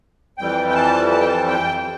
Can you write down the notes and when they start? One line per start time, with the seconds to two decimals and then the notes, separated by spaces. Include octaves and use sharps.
0.38 F2 E3 G3 G5
0.69 G5
0.75 A5
1.11 A5
1.20 G5
1.29 A5
1.47 G5